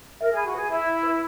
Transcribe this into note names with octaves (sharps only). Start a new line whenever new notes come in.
A#4 E5
G#4 B5
F#4
G#4 B4
E4 E5
E5
B4